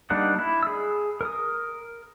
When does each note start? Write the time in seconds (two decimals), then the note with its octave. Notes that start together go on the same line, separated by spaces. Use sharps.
0.10 G3 A#3 D4 D#4 F#5
0.39 E4
0.63 G#4 E6
1.21 A#4 D#6